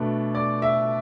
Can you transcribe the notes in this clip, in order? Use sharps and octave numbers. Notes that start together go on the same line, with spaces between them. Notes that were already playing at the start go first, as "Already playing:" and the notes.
Already playing: B2 A3 D4 B4
D5
E5